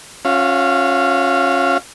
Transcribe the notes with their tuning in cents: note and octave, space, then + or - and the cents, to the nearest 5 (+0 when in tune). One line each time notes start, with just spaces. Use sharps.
C#4 -10 F4 +45 F5 -30